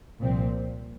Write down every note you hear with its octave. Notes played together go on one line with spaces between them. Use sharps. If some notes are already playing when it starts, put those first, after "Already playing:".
C2 A#2 F3 C4